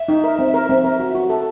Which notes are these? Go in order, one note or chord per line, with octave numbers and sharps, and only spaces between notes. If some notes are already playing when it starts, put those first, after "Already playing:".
Already playing: E5
D#4
A#4
C4
A#4
C4
A#4
F#4
F#4
A4